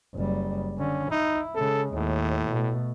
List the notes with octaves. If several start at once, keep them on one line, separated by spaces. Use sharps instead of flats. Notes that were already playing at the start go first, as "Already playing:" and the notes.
F#1 G3
D3 C#4
D#4 E4
C#3 G#3 A4
D#2 A2
B2 A3